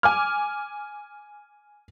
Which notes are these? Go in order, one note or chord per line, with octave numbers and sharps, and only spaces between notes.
G#5 D6 F6